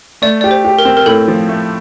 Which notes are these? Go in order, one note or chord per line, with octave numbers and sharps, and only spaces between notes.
A3 D5
G4 D5
C5
G4
A#4
C4
A#4
A2 A4
F3
A3